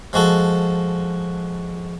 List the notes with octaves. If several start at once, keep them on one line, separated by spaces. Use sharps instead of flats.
F3 G#3 F#4 A4